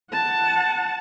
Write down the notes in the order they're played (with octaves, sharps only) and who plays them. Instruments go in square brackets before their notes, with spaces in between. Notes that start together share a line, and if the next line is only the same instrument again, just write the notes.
[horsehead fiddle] F#5 A5